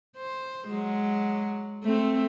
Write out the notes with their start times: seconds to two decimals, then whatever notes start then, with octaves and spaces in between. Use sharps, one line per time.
0.17 C5
0.69 F#3 G#3
1.84 A3 C4